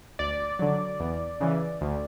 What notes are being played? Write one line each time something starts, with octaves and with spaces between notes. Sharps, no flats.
D2 D5
D3 F#3
E2
C#3 E3
D2